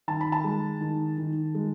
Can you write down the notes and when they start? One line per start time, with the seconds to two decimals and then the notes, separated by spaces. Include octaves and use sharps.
0.08 D#3 A5
0.21 B5
0.32 A5
0.44 G#3
0.81 D#3
1.18 D#3
1.55 G#3